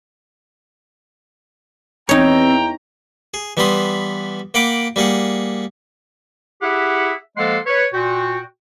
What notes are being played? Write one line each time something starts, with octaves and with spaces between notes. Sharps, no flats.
E2 C4 D#4 C#5 G5 A#5
G#4
E3 G3 B3 B5 C6 D#6
A#3 F#5 G5 B5 D6
G3 A#3 G#4 F#5
E4 G4 G#4 E5 F#5
F3 G#3 A#3 A4 F#5 C6
B4 C#5
A#2 F#4 G5